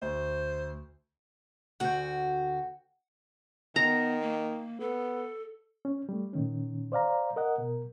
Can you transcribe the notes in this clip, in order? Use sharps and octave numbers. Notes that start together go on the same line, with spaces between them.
D2 C5
D2 F#4 F#5 G5
D#3 B3 A#5
A#3
B3 A4
C#4
G3 A3
A#2 D#3 C#4
C5 D5 F5 A#5
A#4 D#5 F#5
B2 A#4